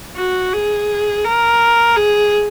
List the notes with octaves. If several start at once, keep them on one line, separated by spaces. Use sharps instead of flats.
F#4
G#4
A#4
G#4